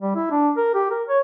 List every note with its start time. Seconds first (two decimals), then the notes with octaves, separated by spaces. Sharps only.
0.02 G3
0.16 E4
0.31 D4
0.57 A#4
0.75 G4
0.91 A#4
1.09 C#5